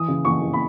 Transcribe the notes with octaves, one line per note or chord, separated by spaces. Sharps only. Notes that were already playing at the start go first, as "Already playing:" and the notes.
Already playing: E3 D#6
C#3
E3 C#6
E3
B5